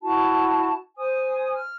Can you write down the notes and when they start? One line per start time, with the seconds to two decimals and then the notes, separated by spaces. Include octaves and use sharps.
0.01 E4 F#4 A5
0.96 C5 G#5 D#6
1.53 F6